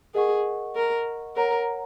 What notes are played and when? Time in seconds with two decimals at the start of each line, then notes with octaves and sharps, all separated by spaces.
0.15 G#4 A#4 D#5 F#5 C#6
0.75 A#4
1.36 A#4 C#5 F#5 A#5